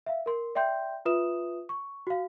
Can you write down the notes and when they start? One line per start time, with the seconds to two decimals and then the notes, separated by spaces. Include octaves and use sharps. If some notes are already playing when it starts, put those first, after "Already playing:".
0.06 E5 F5
0.26 A#4 C6
0.55 D5 E5 G5 C6 G6
1.05 F4 B4 E5 D#6 E7
1.69 C#6
2.07 F#4 F5